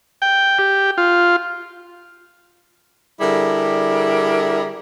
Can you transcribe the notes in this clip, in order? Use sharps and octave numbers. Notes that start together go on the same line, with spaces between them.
G5
G4
F4
D3 G3 E4 G#4 A#4